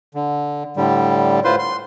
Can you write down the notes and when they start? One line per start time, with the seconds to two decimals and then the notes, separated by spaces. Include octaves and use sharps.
0.15 D3
0.77 A2 D3 G3
1.45 A2 F4 B4 C5 C6
1.59 C6